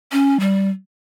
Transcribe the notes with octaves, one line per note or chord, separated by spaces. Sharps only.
C#4
G3